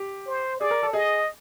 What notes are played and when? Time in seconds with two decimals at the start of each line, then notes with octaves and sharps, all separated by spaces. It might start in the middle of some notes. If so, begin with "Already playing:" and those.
Already playing: G4
0.27 C5
0.60 G#4 D5
0.71 A#4
0.83 A4
0.93 G#4 D#5